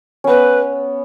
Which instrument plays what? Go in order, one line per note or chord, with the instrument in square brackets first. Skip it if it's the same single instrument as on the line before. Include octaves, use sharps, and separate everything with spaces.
[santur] B3 C#4 [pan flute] B4